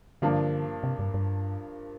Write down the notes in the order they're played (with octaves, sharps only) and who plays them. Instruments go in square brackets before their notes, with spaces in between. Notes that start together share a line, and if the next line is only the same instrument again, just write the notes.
[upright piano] G2 F3 A#3 D4 [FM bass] D3
[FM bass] C3
G2
G2